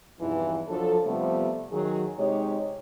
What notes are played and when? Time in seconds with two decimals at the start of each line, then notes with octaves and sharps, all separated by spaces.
0.20 E2 G2 C3 E3 F3 D#4
0.68 F3 F#3 D4 A4
1.06 C3 F3 G3 A3 B3
1.73 D#3 F#3 G#4
2.19 C3 G#3 D#4 G4 C#5